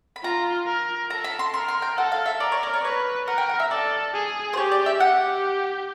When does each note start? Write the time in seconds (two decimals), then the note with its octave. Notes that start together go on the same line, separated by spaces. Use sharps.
0.16 B5
0.24 F4 A#5
0.67 A#4
1.10 A4 A#5
1.24 B5
1.39 C6
1.54 A#4 C6
1.68 C6
1.82 G5
1.97 A4 F#5
2.12 F5
2.26 E5
2.40 A#4 D5
2.52 C#5
2.63 D5
2.73 C#5
2.84 B4 C#5
3.27 A#4 F#5
3.38 G5
3.50 F#5
3.60 E5
3.71 A4 D5
4.14 G#4
4.53 C5
4.57 G4 C#5
4.72 D5
4.86 E5
5.00 G4 F#5